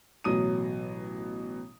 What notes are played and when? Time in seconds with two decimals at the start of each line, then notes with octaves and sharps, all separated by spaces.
0.24 A1 B2 F#3 D#6 D#7